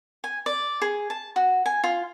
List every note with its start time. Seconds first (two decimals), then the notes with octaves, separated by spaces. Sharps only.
0.24 G#5
0.46 D5
0.82 G#4
1.10 A5
1.36 F#4
1.66 G#5
1.84 F4